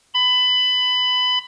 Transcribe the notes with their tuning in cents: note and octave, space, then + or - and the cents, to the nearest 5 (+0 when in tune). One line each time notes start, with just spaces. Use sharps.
B5 +20